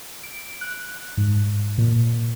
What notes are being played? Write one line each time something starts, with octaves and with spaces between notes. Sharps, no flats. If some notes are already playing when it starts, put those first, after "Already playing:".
D7
F#6
G#2
A#2